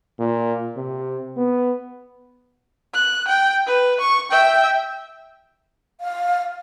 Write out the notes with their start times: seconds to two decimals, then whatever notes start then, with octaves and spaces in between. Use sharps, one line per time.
0.19 A#2
0.77 C3
1.37 B3
2.94 F#6
3.28 G5
3.67 B4
4.01 C#6
4.31 E5 G5
6.00 F5